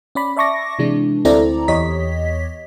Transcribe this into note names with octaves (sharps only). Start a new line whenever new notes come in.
C#4 D5 B5
D5 E5 A5 C#6 D6 A#6
C3 E3 G#3 D4
D2 C4 E4 A4 D5 A#5
E2 G4 C#5 D#5 B6